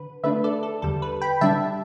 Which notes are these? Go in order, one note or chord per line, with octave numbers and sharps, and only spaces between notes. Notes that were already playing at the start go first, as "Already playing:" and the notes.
Already playing: D3 B4
D3 A3 D4 B4 E5
A4 D5
A4
E2 D3 G3 A4
B4
G5 B5
D3 G3 D4 E5 A5